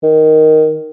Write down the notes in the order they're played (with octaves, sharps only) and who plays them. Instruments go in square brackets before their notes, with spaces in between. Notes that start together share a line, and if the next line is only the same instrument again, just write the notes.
[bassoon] D#3